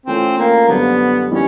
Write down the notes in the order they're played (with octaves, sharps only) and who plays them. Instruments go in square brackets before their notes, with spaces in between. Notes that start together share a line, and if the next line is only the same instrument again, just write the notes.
[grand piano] E3 A3 C#4 F4 [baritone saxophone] C4
[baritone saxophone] A#3
[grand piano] F#2 D3 G3 C4 [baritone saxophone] B3
[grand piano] E3 G3 C4 D#4 [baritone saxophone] C#4